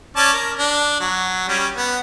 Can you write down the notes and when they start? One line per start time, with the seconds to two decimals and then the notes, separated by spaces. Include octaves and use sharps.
0.16 C#4 D5 A5
0.33 A#4
0.59 D4
1.00 F#3
1.48 G3 C#4
1.77 B3